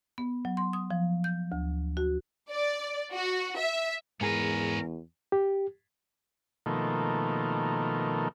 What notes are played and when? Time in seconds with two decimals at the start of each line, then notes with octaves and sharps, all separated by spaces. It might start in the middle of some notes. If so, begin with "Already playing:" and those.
0.18 B3
0.45 F#3
0.57 C6
0.73 D#6
0.91 F3
1.24 G6
1.52 D2
1.97 F#4
2.52 D5
3.12 F#4
3.58 E5
4.21 E2 G#2 C#4 G#4 A#4 B4
5.32 G4
6.66 B2 D#3 F3 A3 A#3